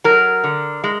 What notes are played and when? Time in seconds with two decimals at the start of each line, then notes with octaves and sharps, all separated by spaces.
0.04 F#3 A#4
0.44 D3
0.84 G#3